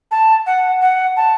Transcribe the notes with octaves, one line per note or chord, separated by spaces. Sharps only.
A5
F#5
F#5
A5